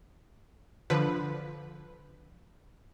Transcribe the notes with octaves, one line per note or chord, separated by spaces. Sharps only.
D3 F3 B4